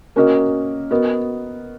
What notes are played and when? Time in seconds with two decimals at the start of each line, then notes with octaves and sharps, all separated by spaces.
0.16 A#3 C#4 F#4 A#4 D#5
0.91 B3 F#4 A#4 D#5